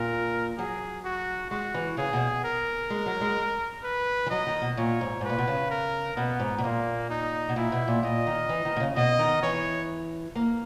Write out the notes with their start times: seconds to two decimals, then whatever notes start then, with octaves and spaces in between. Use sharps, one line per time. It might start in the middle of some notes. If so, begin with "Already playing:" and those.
Already playing: A#2 A#4
0.57 F#3 G#4
1.05 F#4
1.51 G#3 F#4
1.74 E3
1.97 C#3 G#4
2.13 B2
2.44 A#4
2.90 G#3
3.06 F#3
3.21 G#3
3.83 B4
4.26 E3
4.30 F#3 D#5
4.47 D#3
4.62 B2
4.77 A#2 C#5
5.01 G#2
5.21 G#2 B4
5.29 A#2
5.38 B2
5.48 C#3
5.70 A#4
6.16 B2 B3
6.40 G#2
6.58 B2
6.63 A#2 A#3
7.10 D#4
7.49 B2
7.56 A#2 E4
7.72 B2
7.88 A#2
8.03 A#2 D#5
8.27 D#3
8.49 E3
8.65 D#3
8.76 B2
8.80 C#3
8.96 B2 D#5
9.19 D#3
9.43 E3 C#5
10.35 A#3